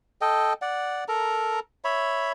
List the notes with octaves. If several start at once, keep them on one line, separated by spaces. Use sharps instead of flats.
A4 D#5 G5
D5 F#5
A4 A#4 A#5
C#5 E5 B5